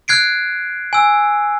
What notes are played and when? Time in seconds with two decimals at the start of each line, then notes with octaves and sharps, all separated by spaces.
0.08 F6 F#6 G#6 C7 D7
0.93 G#5 E6